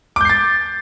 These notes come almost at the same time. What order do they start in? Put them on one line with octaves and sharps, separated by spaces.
D6 G6 C7 A6